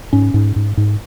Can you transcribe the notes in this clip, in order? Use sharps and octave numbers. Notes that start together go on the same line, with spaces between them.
G#2 C#4
G#2
G#2
G#2